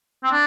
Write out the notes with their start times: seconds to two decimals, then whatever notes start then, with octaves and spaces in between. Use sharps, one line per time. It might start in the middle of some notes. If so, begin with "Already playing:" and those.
0.24 C4
0.31 D4